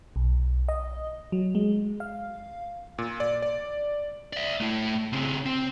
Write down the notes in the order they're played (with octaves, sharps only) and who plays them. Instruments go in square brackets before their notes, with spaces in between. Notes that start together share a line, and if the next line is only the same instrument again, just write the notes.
[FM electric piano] B1
D#5
F#3
G#3
F5
[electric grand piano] A#2
D5
D5
[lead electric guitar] D5 E5
A3 E4
C#3 C4
C4